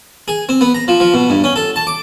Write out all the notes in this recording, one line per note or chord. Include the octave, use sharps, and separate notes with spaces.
G#4
C4
B3
A#5
F3
F3
B2
G2
C#4
A4
A5
D6